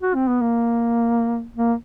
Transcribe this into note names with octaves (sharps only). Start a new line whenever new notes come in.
F#4
C4
B3
A#3
A#3